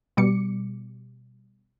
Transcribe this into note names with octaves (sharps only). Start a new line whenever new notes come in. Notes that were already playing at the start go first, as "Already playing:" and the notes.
B2 G3 D6 C#7